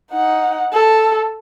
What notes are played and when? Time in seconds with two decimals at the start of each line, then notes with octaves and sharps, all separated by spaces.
0.13 D#4 F#5
0.73 A4